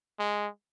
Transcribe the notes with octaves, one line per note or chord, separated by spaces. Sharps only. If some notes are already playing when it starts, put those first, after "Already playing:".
G#3